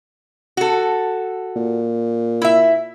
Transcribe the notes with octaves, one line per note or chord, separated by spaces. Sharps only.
F#4 A4
A#2
E4 E5